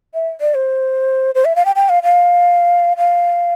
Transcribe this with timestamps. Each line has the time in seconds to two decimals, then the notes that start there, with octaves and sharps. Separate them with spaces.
0.14 E5
0.41 D5
0.55 C5
1.35 C5
1.45 E5
1.56 F5
1.65 G5
1.76 G5
1.89 F5
2.03 F5
2.97 F5